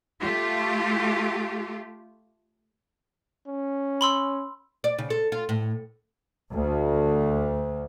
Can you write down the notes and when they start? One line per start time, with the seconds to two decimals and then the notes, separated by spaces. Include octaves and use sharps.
0.23 A3 F4 G4
3.48 C#4
4.01 B5 C6 E6
4.84 D5
4.98 C#3
5.10 A4
5.32 F4
5.49 A2
6.52 D2